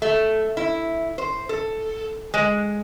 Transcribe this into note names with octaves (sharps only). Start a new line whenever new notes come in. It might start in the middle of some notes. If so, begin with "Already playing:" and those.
A3
E4
C5
A4
G#3